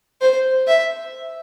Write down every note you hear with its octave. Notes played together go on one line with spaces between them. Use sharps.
C5
E5